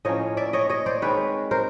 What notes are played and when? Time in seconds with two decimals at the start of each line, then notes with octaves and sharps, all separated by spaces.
0.05 A2 F3 A#3 C#4 C#5 D#5
0.37 D5 E5
0.53 C#5 D#5
0.69 C#5 D#5
0.86 C5 D5
1.02 D#3 G#3 C4 B4 C#5
1.51 A#4 C5